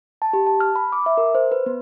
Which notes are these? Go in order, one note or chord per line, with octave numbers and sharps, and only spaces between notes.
A5
G4
A5
F6
B5
D6
E5
A#4
C5
B4
B3